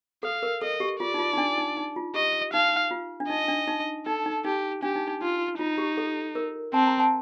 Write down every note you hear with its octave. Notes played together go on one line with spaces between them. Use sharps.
A4 F5
A#4
A4 D#5
G4
F4 D5
D#4
F4
D#4
D4
D#4
D#4
F4
G4 D#5
D#4 F5
F4
D4
D#4 D#5
D4
D#4
D#4 A4
D#4
D#4 G4
D4 G4
D#4
D#4
D#4 F4
D#4 F4
G4
A4
A#4
C4 A5
A#5
A5